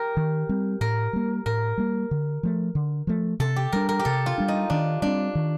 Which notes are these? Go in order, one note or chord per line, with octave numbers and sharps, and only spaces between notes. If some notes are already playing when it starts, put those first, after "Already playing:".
Already playing: G4 A#4
D#3
G3 C4
A2 A#4
G3 A#3
A2 A#4
G3 A#3
D3
F3 A3
D3
F3 A3
C3 A4
G4
G3 D4 A#4
A#4
G4
C3 A4
F4
G3 D4
D#4
D#3 D4
G3 C4 D4
D#3